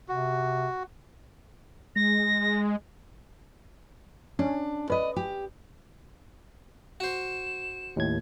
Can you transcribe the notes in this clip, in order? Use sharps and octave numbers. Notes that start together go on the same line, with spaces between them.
C3 F#4
G#3 A#6
C#4 D4
B4 D5 D#5
G4
F#4 C5 E7
D#2 A2 G#6